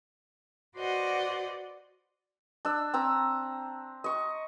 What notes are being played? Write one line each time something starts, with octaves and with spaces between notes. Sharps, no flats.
F#4 B4 C5 D5 D#5 F#5
D4 E6
C4 A#5 E6
D#5 C#6